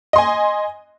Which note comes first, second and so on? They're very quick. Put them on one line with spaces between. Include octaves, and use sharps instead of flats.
D#5 C6 G#5